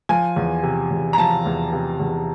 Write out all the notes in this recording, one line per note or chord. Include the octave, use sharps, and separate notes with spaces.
F3 G#5
E2
C3
E2
A#5
F3 A5
E2
C3
E2